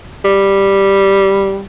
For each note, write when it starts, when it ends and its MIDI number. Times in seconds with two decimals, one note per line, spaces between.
0.25 1.62 55